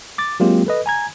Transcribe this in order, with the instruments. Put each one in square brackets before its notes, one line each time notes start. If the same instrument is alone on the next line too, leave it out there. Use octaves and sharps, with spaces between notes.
[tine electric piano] D6 A6
F#3 G#3 A#3 C4 F4 G4
A4 B4 D#5
G#5 A#5 G#6